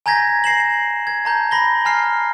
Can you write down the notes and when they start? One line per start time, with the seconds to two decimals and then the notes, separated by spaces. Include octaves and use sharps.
0.06 G#5 A#5 G6 G#6 A#6 B6
0.44 A#6 C7 E7 F#7
1.07 G#6
1.25 A5 A#5 G6
1.51 B5 A#6 G7
1.85 G#5 A#5 F6 C7